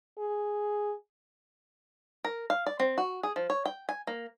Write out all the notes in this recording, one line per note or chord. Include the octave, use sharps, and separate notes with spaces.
G#4
A#4
F5
D5
C4
F#4
G#4
F3
C#5
G5
G#5
A#3